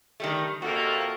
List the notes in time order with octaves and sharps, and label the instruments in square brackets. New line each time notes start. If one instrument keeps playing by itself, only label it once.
[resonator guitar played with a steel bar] D#3 G3 A3
[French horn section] F2 C3 A#3 [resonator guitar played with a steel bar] F#4 [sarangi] A4